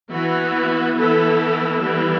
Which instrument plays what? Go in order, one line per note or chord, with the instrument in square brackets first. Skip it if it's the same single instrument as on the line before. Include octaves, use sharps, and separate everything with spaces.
[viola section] E3 B3 F#4
E3 B3 E4 A4
E3 G3 B3